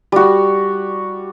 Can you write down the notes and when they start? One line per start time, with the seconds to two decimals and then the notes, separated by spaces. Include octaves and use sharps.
0.12 G3 F#4